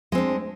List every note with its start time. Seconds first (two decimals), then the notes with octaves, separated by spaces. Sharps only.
0.12 G#3
0.15 C4
0.18 D4